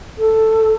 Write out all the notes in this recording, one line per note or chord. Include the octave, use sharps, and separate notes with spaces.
A4